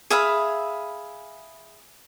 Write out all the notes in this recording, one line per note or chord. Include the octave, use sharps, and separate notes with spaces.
G#4 E5 F5 B5